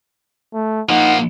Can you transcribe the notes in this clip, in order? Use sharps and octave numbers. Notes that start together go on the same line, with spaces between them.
A3
F3 A#3 D#4 F#5